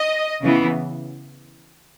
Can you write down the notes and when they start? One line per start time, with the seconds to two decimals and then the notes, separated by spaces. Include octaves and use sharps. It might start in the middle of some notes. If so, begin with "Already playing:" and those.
Already playing: D#5
0.43 C#3 E3 B3